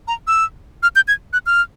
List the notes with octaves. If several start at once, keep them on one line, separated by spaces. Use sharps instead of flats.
A#5
E6
F6
G6
G#6
F#6
F6